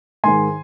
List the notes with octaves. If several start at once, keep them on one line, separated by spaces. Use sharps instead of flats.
G#2 D#3 G#3 G#5 C6